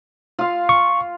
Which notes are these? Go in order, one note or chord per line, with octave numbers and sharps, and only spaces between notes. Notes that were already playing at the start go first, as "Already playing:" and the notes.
F4 F5
C#6